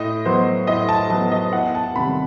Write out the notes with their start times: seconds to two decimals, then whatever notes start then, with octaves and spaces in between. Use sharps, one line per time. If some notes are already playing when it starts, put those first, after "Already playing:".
Already playing: A2 D#5
0.25 F#3 B3 C5
0.67 A2 D#5
0.89 A5
1.10 F#3 B3 A5
1.32 D#5
1.53 E2 F#5
1.75 A5
1.96 C3 D#3 G3 B5